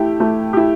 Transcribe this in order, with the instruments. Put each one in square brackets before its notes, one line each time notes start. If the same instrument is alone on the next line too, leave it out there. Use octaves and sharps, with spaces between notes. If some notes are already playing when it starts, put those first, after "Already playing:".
Already playing: [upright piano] A3 E4 G4
A3
E4 G4